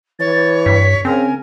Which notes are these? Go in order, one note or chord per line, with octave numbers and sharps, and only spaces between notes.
E3 C#5 A6
G2 B6
C#3 C4 A#4 G#5